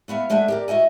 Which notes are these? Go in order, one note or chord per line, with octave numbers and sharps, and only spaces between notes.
A3 B3 E5 F5
G#3 A3 D4 E5 F#5 G#5
G4 A#4 D5
F#4 D#5 E5 G#5